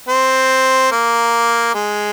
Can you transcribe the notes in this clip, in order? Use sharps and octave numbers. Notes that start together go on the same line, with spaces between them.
C4
A#3
G#3